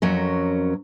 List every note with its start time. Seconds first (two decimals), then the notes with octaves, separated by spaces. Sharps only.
0.02 F2 F#3 C#4 A#4